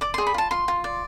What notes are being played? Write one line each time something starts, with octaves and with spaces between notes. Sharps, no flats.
D5 D6
C6
G#4
B5
F4 A5
F4 C6
F4
D5